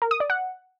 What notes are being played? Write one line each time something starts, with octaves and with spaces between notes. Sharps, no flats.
A#4
D#6
D5
F#5